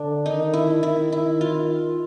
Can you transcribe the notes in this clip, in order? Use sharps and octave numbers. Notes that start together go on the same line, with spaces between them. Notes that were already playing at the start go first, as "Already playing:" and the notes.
Already playing: D3 D4
D#3 D#4
E4
E4
E4
F4